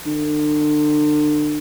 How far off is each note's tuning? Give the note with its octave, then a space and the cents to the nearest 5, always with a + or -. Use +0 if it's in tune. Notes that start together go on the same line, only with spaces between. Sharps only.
D3 +35